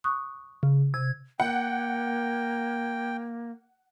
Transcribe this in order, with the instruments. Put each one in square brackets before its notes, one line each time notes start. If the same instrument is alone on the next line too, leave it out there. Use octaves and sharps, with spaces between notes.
[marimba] C#6 D#6 F#6
[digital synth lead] C#3
[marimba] C3 [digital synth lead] G#6
[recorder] A#3 [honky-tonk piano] F#5 [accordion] G5